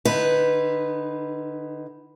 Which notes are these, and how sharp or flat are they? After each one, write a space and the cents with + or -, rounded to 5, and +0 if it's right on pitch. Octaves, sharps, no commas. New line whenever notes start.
D3 +30 D#4 +0 B4 +0